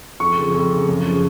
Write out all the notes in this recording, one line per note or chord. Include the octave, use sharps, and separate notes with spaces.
F2 C#6
C#3 F3
F2
C#3 F3
F#2
C#3 F3